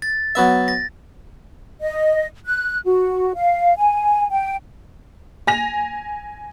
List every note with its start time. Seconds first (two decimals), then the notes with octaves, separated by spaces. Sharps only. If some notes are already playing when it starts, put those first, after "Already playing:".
0.02 A6
0.35 F#3 B3 E5
0.68 A6 A#6
1.81 D#5
2.46 F#6
2.85 F#4
3.35 F5
3.76 G#5
4.31 G5
5.47 G#5 A#6 F7